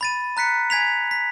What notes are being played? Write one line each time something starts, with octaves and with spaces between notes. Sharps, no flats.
B5 A6 D#7
A#5 F#6 B6 C#7
G#5 G#6 B6 F7
B6